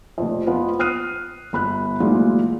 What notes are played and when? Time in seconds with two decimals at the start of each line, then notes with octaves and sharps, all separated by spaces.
0.18 F1 F2
0.47 F2 B3 F4
0.79 D#6 F6 F#6 C7 D#7
1.53 G1 B5 F#6
2.00 D2 A#2 E3 F#3 G#3